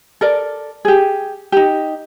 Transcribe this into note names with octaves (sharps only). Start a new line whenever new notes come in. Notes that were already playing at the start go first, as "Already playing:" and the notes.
A4 A#4 D5
G4 G#4
D#4 G4